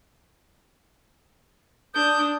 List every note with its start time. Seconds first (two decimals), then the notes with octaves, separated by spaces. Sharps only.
1.95 D4 D#6 G6